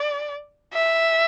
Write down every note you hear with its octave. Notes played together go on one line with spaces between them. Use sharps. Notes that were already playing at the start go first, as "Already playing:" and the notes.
Already playing: D5
E5